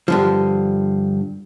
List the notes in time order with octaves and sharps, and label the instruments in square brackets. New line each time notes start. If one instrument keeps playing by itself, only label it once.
[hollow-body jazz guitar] G2 D3 F3